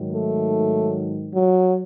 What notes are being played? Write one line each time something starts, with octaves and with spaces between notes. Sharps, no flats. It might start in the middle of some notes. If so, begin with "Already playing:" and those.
Already playing: G#2 D#3 F#3
A3
F#3